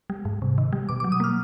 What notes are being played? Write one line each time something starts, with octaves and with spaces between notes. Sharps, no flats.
G3
G#2
C3
D#3
G3
B2 D6
F#3 D6
D#6
A#3 F6